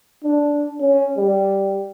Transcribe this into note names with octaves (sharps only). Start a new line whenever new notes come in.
D4
C#4
G3